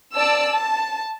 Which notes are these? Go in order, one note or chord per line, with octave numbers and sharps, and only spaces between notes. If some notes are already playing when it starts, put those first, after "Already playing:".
D5 A5 E6
A5